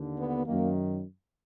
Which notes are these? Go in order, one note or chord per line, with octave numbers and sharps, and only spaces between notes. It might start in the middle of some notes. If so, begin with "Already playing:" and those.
Already playing: D#2 D3
B3
F#2 D#3 A#3